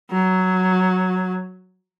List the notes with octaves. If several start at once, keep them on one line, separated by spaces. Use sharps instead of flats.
F#3